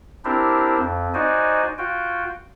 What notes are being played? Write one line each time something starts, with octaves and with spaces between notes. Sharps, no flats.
C4 D4 E4 G4 A#4 C5
F2
D#4 F#4 C5 D5 D#5 G#5
F4 F#4 G5